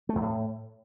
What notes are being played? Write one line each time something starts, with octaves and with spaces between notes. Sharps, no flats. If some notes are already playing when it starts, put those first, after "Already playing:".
A3
E2
A2